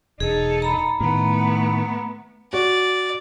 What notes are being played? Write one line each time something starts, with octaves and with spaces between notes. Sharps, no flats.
E1 D#4 G#4 A4
A#5 B5
A2 D#3 A3 B3
F#4 D5